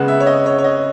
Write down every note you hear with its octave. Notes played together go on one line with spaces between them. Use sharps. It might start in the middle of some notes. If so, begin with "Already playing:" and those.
Already playing: C#3 G#3 B3 F#5
E5
C#5
D#5
C#5
C#5
D#5